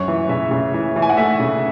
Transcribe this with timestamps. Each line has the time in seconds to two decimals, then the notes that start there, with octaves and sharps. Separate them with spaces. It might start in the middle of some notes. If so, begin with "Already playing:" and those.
Already playing: F#2 C#5
0.08 E3
0.29 C#3 E5
0.51 C#3
0.74 E3
0.96 E3
1.02 G#5
1.09 F#5
1.17 A3 E5
1.39 C#3